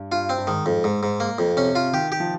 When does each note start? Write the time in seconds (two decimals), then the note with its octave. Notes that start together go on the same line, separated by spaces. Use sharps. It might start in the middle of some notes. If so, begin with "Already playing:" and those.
Already playing: G2
0.12 G2 F4
0.29 C4
0.38 G2
0.47 G#2 D#3
0.66 F2
0.84 G#2
1.03 G#2
1.20 A#3
1.38 F2
1.57 C3 C#4
1.75 F4
1.93 D#3 G4
2.12 G4
2.20 F3